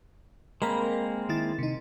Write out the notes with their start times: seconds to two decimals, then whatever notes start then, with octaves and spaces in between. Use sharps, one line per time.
0.62 G#3 A#3 C4 A#4 A#5 B5
1.29 D#3 E4 A6
1.58 C3 D#4